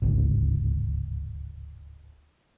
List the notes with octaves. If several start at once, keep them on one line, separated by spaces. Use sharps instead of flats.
D1 G#1 C#2